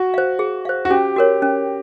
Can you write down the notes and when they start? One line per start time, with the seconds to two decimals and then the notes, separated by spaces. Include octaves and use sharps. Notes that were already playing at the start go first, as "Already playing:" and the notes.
Already playing: F#4
0.14 C5 F5
0.39 G#4
0.65 C5 F5
0.85 F#4
0.90 C#4 G4
1.16 F#4 A#4 C#5
1.42 C#4